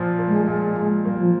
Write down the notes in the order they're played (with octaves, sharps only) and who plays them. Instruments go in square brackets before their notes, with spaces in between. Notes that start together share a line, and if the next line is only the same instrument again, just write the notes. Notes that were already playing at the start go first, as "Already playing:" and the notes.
Already playing: [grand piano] A#2 F3 A#3
A#3
[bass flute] G#3
[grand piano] A#2 [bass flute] G#3
[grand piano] A#2
[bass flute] G3 [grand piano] A#3
[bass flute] F3